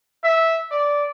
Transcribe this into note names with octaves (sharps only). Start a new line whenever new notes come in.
E5
D5